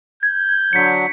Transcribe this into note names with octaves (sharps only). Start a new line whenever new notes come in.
G6 G#6
D3 F#3 B6 C#7